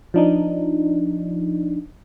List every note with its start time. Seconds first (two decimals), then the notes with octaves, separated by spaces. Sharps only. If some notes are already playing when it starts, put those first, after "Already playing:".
0.14 F3 D4 D#4